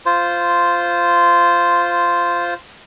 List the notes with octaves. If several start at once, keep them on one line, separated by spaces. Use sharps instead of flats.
F4 C5